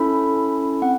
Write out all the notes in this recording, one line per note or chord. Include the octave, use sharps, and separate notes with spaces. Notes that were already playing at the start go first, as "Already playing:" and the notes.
Already playing: C#4 E4 A4 B5
C4 F#5